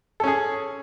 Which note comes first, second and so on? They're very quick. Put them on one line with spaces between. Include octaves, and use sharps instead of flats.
A4 C#4 G#4